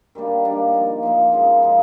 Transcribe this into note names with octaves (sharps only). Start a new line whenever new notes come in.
D#3 G3 A#3 D4
D#3 G3 A#3 D4
F3 A#3 D#4
F3 A#3 D#4
C#3 F3 G#3
C#3 F3 G#3